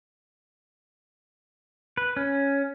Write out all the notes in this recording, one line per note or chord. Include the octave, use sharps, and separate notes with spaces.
B4
C#4